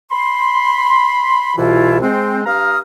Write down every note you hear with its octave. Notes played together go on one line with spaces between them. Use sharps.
B5 C6
C2 B2 E3 E4 F4
G#3 C4
G2 F5 A#5 D#6 F6